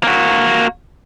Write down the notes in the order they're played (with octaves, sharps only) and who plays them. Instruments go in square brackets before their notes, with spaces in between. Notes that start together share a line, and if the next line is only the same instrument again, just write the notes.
[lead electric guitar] A#3 F#4